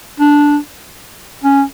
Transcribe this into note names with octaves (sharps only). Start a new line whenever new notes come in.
D4
C#4